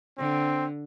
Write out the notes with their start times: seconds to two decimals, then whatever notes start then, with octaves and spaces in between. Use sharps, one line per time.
0.18 D3 C4